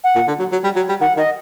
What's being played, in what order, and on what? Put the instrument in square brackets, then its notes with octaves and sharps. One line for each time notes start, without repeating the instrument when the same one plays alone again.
[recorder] F#5
[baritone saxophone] A#2
D3
F#3
F#3
G3
F#3
G3
[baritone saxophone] D#3 [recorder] F#5
[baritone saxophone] D#3 [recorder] D#5